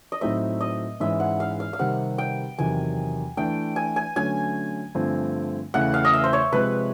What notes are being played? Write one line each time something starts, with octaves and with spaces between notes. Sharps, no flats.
D#5
A2 F#3 A3 C4 D#4 E5
D#5
G#2 E3 G#3 C#4 E4 E5
F#5
F5
F5
F5
C3 D#3 G3 C4 F#5
G5
E2 C3 D#3 F#3 G#5
E3 A3 D4 G5
G#5
G#5
D3 F#3 A3 C#4 G#5
G2 D3 F3 A3 C4
E2 C#3 E3 A3 F#5
F5
D#5
E5
C5
C#5
C3 F3 G#3 C4 B4